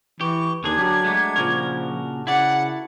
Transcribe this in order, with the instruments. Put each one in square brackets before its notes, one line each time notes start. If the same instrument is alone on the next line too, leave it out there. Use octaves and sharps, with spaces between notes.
[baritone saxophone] E3 [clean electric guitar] G4 [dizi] C#6
[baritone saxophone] D#2 [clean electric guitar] D3 G#4 [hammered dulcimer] D4 [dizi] G#6
[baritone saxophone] F#3 [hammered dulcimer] G4 A4 A#4
[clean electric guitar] G#3 A3 [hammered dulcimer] F#4 D6
[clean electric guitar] A#2 C#3 A#4 [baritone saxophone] F3 [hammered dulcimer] C#6
[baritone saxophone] C#3 [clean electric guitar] E4 D5 [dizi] F#5